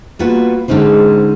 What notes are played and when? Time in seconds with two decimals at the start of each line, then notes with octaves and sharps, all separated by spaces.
0.19 G3 A#3 B3 F4 F#4 B4
0.68 G#2 D3 G#3 C#4 D#4 C5